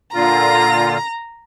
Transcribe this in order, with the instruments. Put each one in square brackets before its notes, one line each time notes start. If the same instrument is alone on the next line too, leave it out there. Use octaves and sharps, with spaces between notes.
[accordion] A#2 D3 F4 [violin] A#5